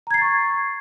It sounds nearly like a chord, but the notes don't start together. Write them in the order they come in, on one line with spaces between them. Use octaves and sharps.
A#5 G#6 C7 A6 C#6